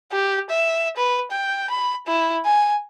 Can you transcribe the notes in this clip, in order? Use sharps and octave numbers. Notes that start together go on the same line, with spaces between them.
G4
E5
B4
G5
B5
E4
G#5